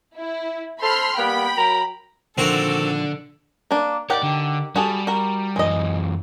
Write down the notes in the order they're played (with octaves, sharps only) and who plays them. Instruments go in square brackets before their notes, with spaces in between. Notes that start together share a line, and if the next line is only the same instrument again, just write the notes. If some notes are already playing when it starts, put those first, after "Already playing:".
[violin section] E4
[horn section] A4 C5 [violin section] B5 C6 F6
[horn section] G3 A#3 B3 [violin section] G5 B5
[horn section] F#3 A#4 A#5
[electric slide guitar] A#2 D#3 F3 [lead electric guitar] D3 [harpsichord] C4 F#4 A#4 [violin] A4
[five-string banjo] A#3 D4
[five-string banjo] D#3 G4 F#5 [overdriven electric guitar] C#5 D5
[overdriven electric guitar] D3
[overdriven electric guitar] G3 [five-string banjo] F#4 G#4 A4
[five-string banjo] F#4 A#4
[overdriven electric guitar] F#2 E3 [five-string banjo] G#3 D#5